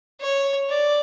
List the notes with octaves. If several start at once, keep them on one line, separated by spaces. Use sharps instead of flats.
C#5
D5